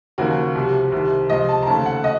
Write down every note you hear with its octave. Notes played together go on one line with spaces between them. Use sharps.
D#2 C#3 F3 A#3 F#4
C2 C3 F3
C2 C3 D#3
C#2 C3 F3 D#5
A5
A#5
D#2 C#3 F3 A3 A5
F#5
D#5